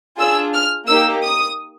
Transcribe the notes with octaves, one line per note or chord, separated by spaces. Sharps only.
D4 F4 G#4 E6
F6
A#3 D#4 G4 E6
D#6